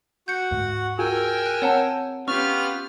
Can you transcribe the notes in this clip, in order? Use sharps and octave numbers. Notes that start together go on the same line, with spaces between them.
F#4 F#5 G6 C#7
D2 G#2
F4 F#4 G#4 A#4 G5 G#5 E6
F#6
C4 C#5 F#5 A5 A#5
B3 C#4 F4 G4 C#6 F6